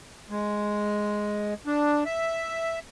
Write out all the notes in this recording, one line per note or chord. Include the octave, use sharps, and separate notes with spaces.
G#3
D4
E5